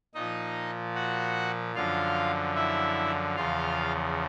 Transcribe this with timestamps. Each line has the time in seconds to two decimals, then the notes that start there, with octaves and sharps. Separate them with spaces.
0.14 A#2 F3 D#4 D#5
0.95 F#4 F#5
1.75 F#2 D3 F3 F4 F5
2.56 E4 E5
3.36 E2 C#3 F3 F4 F5